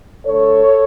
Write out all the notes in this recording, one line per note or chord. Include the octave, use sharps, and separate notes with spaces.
D3 A3 A4 C#5